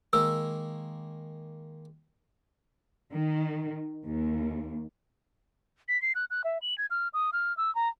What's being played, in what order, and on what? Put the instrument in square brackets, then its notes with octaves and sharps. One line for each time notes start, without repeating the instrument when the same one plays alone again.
[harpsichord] D#3 G#3 A#3 [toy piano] E6
[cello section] D#3
D#2
[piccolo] B6
C7
F#6
F#6
E5
F#7
G#6
F6
D#6
F6
E6
A#5